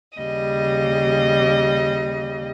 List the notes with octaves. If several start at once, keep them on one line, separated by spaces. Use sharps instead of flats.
D#2 C#3 G3 D#5